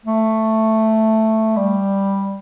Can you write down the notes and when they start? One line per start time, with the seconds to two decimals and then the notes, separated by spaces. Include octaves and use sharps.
0.05 A3
1.56 G3